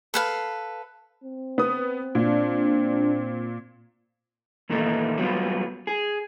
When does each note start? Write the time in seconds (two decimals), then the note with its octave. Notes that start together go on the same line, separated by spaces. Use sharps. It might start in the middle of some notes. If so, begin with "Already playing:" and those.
0.14 A4 B4 F5
1.24 C4
1.58 B3 D#6
2.15 A#2 D4
4.70 E2 A#2 D#3 A3 D#4
5.18 F#3 G3 B3 F4
5.87 G#4